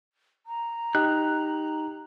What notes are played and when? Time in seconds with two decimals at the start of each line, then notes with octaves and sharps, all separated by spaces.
0.46 A#5
0.95 D#4 G4 F#6